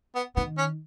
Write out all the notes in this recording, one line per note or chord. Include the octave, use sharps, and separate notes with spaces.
B3
D#3 B3
C#4